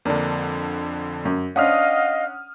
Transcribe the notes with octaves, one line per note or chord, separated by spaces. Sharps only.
F2 D3 A#3 D4
F#2
C#4 D4 C5 D#5 F5 F#5 D#6 F6